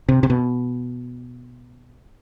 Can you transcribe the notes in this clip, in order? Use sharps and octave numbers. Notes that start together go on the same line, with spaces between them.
C3
C3
B2